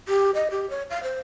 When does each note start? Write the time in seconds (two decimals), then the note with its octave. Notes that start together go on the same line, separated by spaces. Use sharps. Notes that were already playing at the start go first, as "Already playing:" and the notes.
0.08 G4
0.35 D#5
0.51 G4
0.70 C#5
0.90 F5
1.03 C5